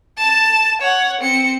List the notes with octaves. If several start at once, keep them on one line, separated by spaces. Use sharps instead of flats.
A5 E7
C#5 F#5
C4 C#7